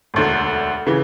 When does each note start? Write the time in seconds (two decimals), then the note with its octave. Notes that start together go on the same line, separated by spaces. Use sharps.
0.14 E1 D2 D3
0.87 C#3 E3